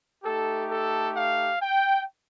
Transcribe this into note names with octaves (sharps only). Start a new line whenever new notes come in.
A3 D#4 G4 A4
A4
F5
G5